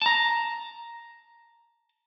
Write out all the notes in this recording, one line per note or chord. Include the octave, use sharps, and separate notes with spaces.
A5 A#5